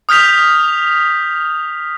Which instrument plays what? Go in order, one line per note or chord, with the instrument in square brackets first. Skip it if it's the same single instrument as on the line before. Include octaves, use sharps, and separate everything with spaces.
[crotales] D#6 F6 G6 B6 F7